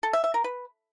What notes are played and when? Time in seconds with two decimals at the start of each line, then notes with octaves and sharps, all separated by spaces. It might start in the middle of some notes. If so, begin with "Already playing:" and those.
0.03 A4
0.13 E5
0.24 E5
0.34 A#4
0.44 B4